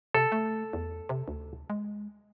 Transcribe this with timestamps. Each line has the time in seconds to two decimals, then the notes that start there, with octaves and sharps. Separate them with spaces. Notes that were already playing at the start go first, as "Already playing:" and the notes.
0.15 C3 A4
0.32 A3
0.73 E2
1.09 C3
1.28 D2
1.70 G#3